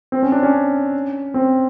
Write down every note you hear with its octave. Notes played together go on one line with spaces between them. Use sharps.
C4
C#4
D4
C#4
C4